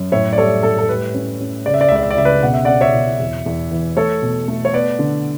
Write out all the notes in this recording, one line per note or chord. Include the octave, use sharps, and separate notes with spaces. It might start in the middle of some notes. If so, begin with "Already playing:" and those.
Already playing: F#2
A2 C#5 E5
D5
G3 A4 C#5
A2 A4
A4
G3 B4
C#4
C#4
C#3 D5
E5
D5
E5
C#2 D5
E5
D5
C#3 E5
B4 D5
B2 F#5
E5
C#4 D5 F#5
C#5 E5
B2
E2
E2
E3
A3 A4 C#5
B2
A3
C#5
B3 B4 D5
D3